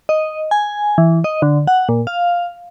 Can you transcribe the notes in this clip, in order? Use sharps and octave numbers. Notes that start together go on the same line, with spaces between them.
D#5
G#5
E3
D#5
D3
F#5
A#2
F5